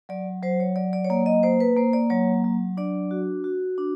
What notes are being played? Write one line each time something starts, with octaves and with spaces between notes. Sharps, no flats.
F#3 D5
F#3 C5
C#5
F#3 D5
D5
C#5
A#3 D5
D#5
A#3 C5
B4
A#3 C5
D5
F#3 C#5
F#3
D4 D5
F#4
F#4
D4